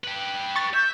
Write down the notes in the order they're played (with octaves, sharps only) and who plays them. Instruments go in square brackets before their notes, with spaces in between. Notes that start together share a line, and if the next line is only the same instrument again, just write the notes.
[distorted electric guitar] G4 B4
[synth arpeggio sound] C#6 A6
[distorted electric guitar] E5 [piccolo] G6